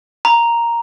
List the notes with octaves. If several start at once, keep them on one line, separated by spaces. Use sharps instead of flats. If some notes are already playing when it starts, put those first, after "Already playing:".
A#5